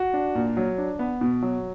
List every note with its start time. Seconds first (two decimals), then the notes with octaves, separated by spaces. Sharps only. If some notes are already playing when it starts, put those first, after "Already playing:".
Already playing: F#4
0.14 D4
0.35 A#2
0.57 F#3
0.78 D4
0.99 B3
1.21 B2
1.42 F#3